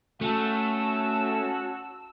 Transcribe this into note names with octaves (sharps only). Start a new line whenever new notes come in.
A3 C#4 F#4 A5 E6